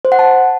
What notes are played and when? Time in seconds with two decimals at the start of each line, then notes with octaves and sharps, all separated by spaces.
0.05 C5
0.12 F#5
0.19 A5